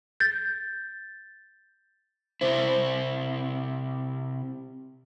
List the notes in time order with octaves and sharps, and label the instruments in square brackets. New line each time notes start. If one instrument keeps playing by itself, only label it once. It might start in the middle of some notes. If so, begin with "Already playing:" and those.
[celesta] G6 A6
[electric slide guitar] C3 E4 [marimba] C5